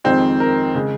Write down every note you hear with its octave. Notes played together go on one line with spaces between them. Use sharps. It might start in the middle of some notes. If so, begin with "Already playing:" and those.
F2 D#3 G#3 C4
A#4
C#3 G#3